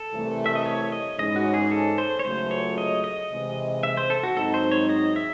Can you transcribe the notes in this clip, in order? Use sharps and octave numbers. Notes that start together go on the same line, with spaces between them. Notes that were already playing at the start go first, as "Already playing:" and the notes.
Already playing: A4
C2 C3 E3 A3
E5
D#5
C#5
D#5
G#2 E3 G#3 C#4 D#5
F#4
G#4
A4
C5
C#5
C#2 C#3 F#3 A3 C5
C#5
D#5
D#5
C3 E3 G#3
E5
C5
A4
F#4
G#2 F#3 C4 D#4 A4
C5
C#5
D#5
E5